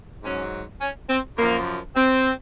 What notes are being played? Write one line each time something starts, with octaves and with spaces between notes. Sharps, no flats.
G#2 F#3 C#4
C#4
C4
F#2 F3 A#3
C4